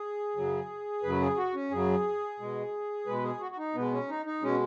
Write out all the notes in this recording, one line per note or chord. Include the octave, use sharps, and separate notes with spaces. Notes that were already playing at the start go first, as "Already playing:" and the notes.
Already playing: G#4
F#2 C#3 F#3
F#2 C#3 F#3 B4
G#4
F#4
C#4
F#2 C#3 F#3 G#4
B2 G#3
B2 G#3 B4
G#4
F#4
F#4
D#4
B2 G#3 B3
C#4
D#4
D#4
B2 G#3 C#4